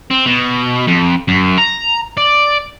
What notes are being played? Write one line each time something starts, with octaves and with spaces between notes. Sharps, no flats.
C4
B2
F2
F#2
A#5
D5